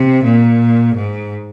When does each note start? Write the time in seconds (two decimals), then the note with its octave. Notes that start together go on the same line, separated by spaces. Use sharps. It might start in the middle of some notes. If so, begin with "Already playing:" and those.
Already playing: C3
0.24 A#2
0.96 G#2